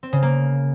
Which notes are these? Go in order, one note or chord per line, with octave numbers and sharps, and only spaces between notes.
C4
C#3
A#3